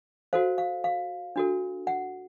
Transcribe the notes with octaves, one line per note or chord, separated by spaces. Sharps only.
F#4 A4 C5 F5
F5
F5
D4 F#4 A4
F#5